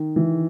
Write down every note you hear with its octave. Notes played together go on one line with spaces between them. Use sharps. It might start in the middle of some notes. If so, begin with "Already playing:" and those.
Already playing: D#3
E3